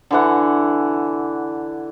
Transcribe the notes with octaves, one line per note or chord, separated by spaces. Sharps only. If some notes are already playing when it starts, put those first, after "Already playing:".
D3 E3 F#5